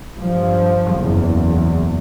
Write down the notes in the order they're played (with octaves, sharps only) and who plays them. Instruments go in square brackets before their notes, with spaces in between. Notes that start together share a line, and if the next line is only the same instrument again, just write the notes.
[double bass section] G2 F3
F#1 E2